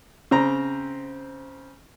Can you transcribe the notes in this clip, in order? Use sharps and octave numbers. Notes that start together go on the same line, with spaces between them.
C#3 C4 A#5